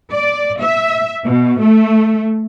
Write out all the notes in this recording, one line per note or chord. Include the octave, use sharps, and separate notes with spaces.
D5
E5
B2
A3